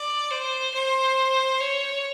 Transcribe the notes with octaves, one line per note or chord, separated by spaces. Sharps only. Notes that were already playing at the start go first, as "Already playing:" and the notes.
Already playing: D5
C5
C5
C#5